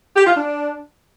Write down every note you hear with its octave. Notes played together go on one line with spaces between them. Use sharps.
G4
F4
D4